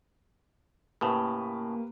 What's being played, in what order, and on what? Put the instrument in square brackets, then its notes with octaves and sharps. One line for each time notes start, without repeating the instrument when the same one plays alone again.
[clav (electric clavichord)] A2 C#3 [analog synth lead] A#3 [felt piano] G4 B4